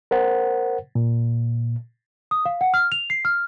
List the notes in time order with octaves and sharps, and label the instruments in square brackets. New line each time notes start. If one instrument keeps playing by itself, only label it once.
[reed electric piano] A#4 C5 F#5
A#2
[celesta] D#6
F5
F#5
F6
F7
C7
F6